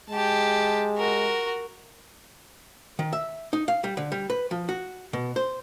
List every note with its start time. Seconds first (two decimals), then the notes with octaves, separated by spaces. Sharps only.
0.10 G#3 G4 A5
0.97 F#4 A#4
2.99 D#3
3.13 E5
3.53 D#4
3.68 F5
3.84 G3
3.97 D3
4.12 G3
4.30 B4
4.51 F3
4.69 F#4
5.13 B2
5.36 C5